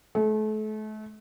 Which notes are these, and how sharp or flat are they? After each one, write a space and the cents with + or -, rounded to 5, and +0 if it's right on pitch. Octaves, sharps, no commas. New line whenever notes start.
A3 -35